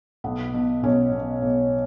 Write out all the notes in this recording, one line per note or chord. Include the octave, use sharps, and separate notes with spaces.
B1 B3
B2
B1 C#4
B2
B1